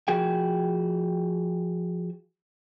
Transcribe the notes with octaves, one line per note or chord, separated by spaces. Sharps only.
F3 F#4 G#4 G5